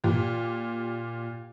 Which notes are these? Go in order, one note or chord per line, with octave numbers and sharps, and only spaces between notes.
A#2 G4